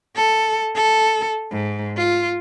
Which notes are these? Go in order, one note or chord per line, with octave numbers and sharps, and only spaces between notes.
A4
A4
G#2
F4